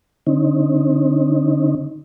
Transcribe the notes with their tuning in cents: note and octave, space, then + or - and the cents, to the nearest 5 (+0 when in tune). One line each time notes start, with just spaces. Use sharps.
D3 +0 C4 +45 D#4 +10